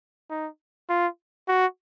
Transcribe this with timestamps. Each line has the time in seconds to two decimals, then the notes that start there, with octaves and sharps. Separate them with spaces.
0.30 D#4
0.89 F4
1.48 F#4